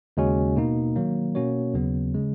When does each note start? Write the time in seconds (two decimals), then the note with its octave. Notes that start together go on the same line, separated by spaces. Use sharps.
0.17 D#2 C#3 G#3 C#4 F#4
0.56 B2 A#3 D#4
0.96 D#3 F#3 A#3
1.35 B2 A#3 C#4 F#4 C#5
1.74 D#2 C#3 F#3 B3
2.14 C#3 G#3